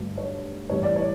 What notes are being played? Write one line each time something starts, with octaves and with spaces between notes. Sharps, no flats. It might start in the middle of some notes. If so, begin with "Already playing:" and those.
Already playing: G1 G2 F#3 A3
C#5
A1 A2 E3 G3 C#5
D5
C#5